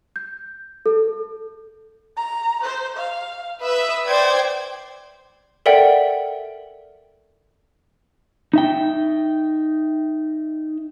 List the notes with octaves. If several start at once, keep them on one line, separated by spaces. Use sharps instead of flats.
G6
A4
A#5
C5
F5
B4 E5 D#6
C5 D5 G5 G#6
A4 A#4 D5 E5 F#5 G5
D#4 E5 G5